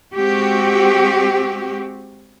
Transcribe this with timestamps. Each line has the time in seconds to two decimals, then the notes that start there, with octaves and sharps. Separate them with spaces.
0.16 G#3 C4 F#4 G4